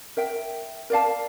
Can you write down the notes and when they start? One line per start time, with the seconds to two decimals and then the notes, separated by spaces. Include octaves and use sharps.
0.17 A#4 E5 G5
0.90 A#4 D5 F5 A5